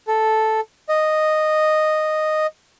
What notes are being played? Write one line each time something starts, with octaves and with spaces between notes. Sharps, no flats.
A4
D#5